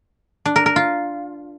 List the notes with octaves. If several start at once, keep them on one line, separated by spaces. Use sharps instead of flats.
D4
A#4
A#4
F4